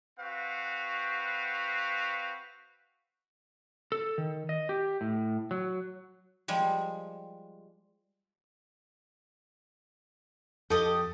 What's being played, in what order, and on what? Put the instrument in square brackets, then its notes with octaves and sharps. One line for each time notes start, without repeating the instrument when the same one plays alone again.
[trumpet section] C4 F#4 B4 F5
[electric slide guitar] A4
D#3
D#5
G4
A2
F#3
[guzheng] F3 G3 G#3
[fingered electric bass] F2 [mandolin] G4 D#5 [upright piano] A4